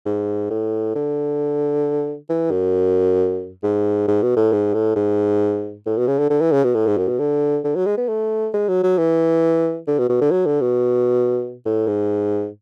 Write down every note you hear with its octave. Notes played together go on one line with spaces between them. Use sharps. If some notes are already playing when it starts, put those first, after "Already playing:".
G#2
A2
D3
E3
F#2
G#2
G#2
B2
A2
G#2
A2
G#2
A2
B2
C#3
D3
D3
E3
C#3
B2
A2
G#2
F#2
B2
D3
D3
F#3
G#3
B3
A3
G#3
F#3
F#3
E3
D3
B2
B2
D3
F#3
D3
B2
A2
G#2